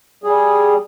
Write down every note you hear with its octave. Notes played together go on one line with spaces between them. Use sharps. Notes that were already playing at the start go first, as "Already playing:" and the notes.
G3 G#4